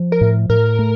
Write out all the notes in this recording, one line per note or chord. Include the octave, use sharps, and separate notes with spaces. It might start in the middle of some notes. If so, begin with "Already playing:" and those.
Already playing: F3
A#4
A2
A2 A#4
A3